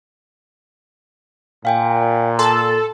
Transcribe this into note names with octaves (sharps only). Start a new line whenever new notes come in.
A#2 F5 G5 G#5
A4 A5 C6